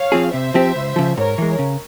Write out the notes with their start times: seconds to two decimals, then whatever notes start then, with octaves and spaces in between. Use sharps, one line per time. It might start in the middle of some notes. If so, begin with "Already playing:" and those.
Already playing: C#5 F5
0.12 F3 C4 F4 G#4
0.33 C3 C5 E5
0.54 F3 C4 G4
0.76 C#2
0.96 C#3 F3
1.17 G#2 A#4 C#5
1.38 E3 G#3
1.59 C#3